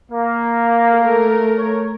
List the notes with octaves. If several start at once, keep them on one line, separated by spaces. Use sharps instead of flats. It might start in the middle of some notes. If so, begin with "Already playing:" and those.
A#3
A3 A#4
C#5